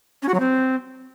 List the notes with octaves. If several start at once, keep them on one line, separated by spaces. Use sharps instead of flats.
C#4
F#4
F#3
C4